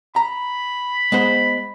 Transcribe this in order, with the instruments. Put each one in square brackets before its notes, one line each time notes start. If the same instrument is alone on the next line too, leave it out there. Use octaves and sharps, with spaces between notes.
[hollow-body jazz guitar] A#5 [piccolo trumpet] B5
[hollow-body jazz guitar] G#3 B3 C5